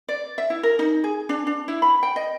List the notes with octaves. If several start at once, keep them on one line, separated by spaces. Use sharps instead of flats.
D5
E5
E4
A#4
D#4
G#4
D4
D4
E4
B5
G5
D#5